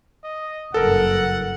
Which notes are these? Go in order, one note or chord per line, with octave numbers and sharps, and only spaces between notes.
D#5
F#1 G2 A4 A#4 F#5